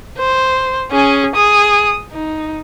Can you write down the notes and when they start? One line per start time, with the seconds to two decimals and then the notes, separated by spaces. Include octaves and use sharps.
0.18 C5
0.91 C#4 G#4
1.35 G#4 D#6
2.12 D#4